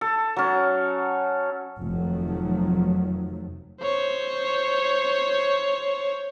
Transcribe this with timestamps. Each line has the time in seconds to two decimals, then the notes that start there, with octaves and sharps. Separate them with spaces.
0.01 A4
0.36 F#3 C#4
1.78 F1 D#3 F3 F#3 A3
3.81 C5 C#5